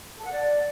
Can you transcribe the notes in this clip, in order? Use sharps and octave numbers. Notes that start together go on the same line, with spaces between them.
A4
F#5
D5